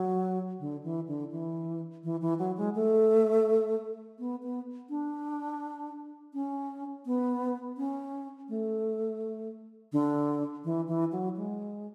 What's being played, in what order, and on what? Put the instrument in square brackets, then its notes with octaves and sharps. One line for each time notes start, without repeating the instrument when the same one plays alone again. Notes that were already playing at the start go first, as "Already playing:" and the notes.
Already playing: [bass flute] F#3
D3
E3
D3
E3
E3
E3
F#3
G#3
A3
B3
B3
D4
C#4
B3
C#4
A3
D3
E3
E3
F#3
G#3